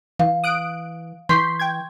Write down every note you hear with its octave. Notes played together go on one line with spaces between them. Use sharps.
E3 F5
D#6 F#6 D7
E3 C6 C#6 G6 B6 C7
G5 G#6